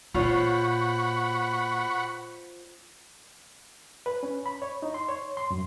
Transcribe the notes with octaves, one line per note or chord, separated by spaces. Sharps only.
A#2 F4 C5 C#5 F#5 B5 C#6
B4
C#4
B5
C#5
D#4
C6
C#5
C6
F#2